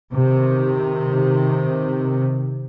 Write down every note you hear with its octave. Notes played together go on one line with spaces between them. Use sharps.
C3 D#3